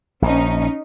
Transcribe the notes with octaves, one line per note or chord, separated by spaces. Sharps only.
A#1 C#4 D#4